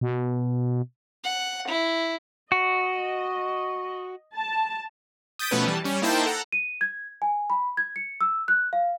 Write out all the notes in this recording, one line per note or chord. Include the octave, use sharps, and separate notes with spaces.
B2
F#5
E4
F#4 D#5
A5
D#6 G6 A6 B6 D7 D#7
B2 F3 A3 B3 C#4 B4
E3 G3 A5
G3 C#4
A#3 D#4 E4 C5 G5 A5
A4 F#5 A#5
D#7
G#6
G#5
B5
G#6
C#7
E6
F#6
F5